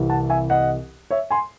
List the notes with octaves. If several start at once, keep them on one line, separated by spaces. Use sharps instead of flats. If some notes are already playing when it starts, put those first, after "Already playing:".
Already playing: C2 C3 E3
F#5 A5
E5 G#5
D#5 F#5
C#5 E5
G#5 C6